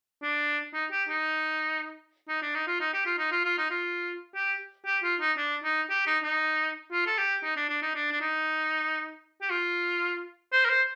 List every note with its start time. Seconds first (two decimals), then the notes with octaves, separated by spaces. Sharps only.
0.23 D4
0.74 D#4
0.91 G4
1.09 D#4
2.28 D#4
2.42 D4
2.54 D#4
2.67 F4
2.80 D#4
2.93 G4
3.06 F4
3.18 D#4
3.31 F4
3.45 F4
3.58 D#4
3.70 F4
4.35 G4
4.86 G4
5.03 F4
5.20 D#4
5.37 D4
5.64 D#4
5.90 G4
6.06 D#4
6.24 D#4
6.92 F4
7.06 A4
7.18 G4
7.43 D#4
7.57 D4
7.69 D4
7.82 D#4
7.95 D4
8.11 D4
8.21 D#4
9.41 G4
9.50 F4
10.52 C5
10.65 A#4
10.70 C5